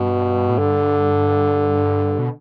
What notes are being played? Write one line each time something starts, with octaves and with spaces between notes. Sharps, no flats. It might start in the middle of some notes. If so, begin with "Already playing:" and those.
Already playing: G2 B2
A2
G2 D3
B2